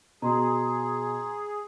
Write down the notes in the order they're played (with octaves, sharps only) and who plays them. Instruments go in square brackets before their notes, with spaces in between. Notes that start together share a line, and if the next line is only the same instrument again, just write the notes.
[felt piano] B2 [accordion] G#4 [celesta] A#5 C6